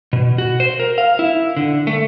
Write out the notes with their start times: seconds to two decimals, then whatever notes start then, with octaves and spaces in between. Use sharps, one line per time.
0.13 B2
0.38 F#4
0.60 C5
0.80 A#4
0.98 F5
1.19 E4
1.57 D3
1.87 A3